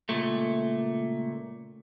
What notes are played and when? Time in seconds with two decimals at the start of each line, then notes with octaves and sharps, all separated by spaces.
0.09 C#2 A#2 A3